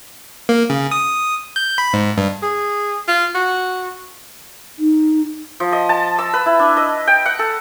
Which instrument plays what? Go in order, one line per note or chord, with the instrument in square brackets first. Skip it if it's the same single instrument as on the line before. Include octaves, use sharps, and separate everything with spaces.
[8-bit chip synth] A#3
C#3
D#6
G6
B5
G#2
G2
[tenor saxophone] G#4
F4
F#4
[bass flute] D#4
[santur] F3
D#5
A5
E6
B4
E4
D4
D#5
G5
F#5
A4